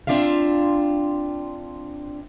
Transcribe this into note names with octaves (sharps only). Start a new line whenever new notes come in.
C4 D4 F4 E5 F5